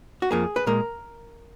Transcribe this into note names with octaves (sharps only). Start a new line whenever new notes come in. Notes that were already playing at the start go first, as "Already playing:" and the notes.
F#4
F2 F3 A#3 G#4
B4
A#2 G#3 A#4